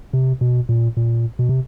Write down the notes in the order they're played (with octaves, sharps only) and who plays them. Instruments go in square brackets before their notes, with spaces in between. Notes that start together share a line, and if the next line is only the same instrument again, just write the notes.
[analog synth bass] C3
B2
A#2
A#2
B2
C3